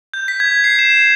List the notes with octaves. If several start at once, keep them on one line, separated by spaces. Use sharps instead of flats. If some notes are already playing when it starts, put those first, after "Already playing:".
G6
B6
G#6
C7
E7